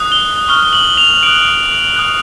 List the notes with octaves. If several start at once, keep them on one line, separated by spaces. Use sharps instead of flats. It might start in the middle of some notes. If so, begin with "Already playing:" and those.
Already playing: D#6 F#6
G7
G7
C#6 F6 G7
G7
F#7
F7
D#6 F#6 D7
D#6 F#6